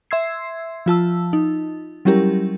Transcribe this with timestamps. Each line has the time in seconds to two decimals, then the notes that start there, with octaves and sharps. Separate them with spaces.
0.11 E5 C6 E6 G#6 C7
0.86 F3 F4 A5 E6
1.33 D#4
2.05 F#3 G3 C#4 E4 G4 A#4